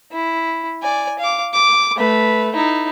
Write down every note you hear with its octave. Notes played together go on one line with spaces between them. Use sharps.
E4
D5 G#5
F5 D6
D6
A3 B4
D#4 E4